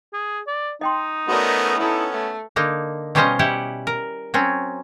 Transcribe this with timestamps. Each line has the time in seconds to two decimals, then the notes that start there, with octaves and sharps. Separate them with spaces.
0.13 G#4
0.47 D5
0.81 D#4 D#5 G5 C6
1.28 A3 B3 C#4 F#4 A#4 D5 D#5
1.79 B3 C#4 E4 A4 B4 D#5 A#5
2.13 A3
2.56 D3 A#3 D#4
3.15 B2 G3 C#4 F4 C5 D#5
3.39 G3 E4 G4 F#5
3.87 A#4
4.34 F#3 C4 C#4